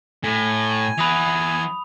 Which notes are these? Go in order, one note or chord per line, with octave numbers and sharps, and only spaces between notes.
A2 G#5
E3 F#5 B5 D#6 F7